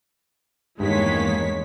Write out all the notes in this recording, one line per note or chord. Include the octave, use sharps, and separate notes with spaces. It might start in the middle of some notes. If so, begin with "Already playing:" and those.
E2 G2 D#3 G#3 A#3 C#5 B6